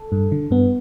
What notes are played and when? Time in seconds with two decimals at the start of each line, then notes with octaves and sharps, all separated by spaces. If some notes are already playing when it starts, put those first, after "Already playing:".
Already playing: A4
0.12 G2
0.32 D3
0.51 G2 B3